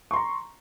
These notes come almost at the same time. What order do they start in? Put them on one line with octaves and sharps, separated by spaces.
C#6 C6 A#5